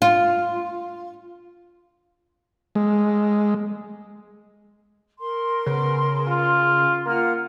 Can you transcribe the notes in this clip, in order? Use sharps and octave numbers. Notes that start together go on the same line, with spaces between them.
F4
G#3
A#4 C6
C#3 B3
F4
A#3 F4 F#5 F6